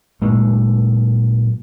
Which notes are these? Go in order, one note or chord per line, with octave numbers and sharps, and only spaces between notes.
A#2 F#3 G#3 A3